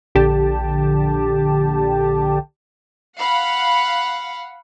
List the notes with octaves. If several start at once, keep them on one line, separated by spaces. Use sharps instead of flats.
A#1 D3 G4 A5
F5 F#5 B5